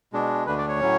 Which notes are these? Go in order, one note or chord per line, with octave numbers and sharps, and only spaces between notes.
B2 G#3 D4
D2 D3 A3 D4 B4
D5
C#5
A2 F#3 C#4